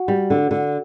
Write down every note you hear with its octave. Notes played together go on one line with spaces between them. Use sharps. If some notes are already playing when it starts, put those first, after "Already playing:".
Already playing: F#4
G3
D3
D3